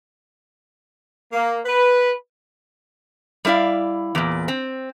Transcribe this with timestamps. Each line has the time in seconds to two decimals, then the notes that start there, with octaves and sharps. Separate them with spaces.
1.33 A#3
1.66 B4
3.45 G3 A3 E4 D5 F5
4.15 E2 A#2
4.48 C4